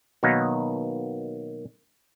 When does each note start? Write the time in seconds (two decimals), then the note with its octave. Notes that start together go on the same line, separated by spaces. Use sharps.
0.23 B2 D#3 F#3 A#3 B3 D#4